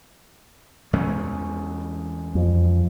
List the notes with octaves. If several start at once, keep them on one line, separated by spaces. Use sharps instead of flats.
E2 G#3 C#4
F2